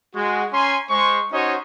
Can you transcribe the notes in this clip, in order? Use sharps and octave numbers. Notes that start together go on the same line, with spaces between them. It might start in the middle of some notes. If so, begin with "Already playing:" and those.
G#3 F#4
C#4 G#5 A#5 C6
G#3 C5 C#6
C#4 D#4 F#4 C5 C#5 D#5